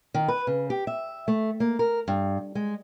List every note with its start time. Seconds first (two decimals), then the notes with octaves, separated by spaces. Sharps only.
0.14 D#3
0.28 B4
0.47 C#3
0.70 G4
0.87 E5
1.28 A3
1.60 A#3
1.79 A#4
2.08 G2
2.55 G#3